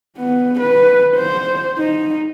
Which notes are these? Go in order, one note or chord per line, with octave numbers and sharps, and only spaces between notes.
B3
B4
C5
D#4